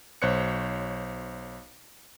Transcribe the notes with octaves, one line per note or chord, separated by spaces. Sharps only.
B1 C5 C#5 F#6 C#7